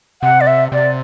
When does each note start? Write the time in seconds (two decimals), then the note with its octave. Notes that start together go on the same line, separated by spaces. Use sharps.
0.22 C3 F#5
0.41 D5
0.47 E5
0.72 C3 D5